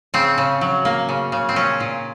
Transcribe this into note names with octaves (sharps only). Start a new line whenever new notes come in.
C#3 C4
C#3
F#3
A#3
C#3
C#3
C4
A#2 C#4
A#2